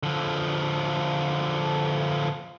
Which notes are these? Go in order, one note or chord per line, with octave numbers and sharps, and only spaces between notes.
D3 F3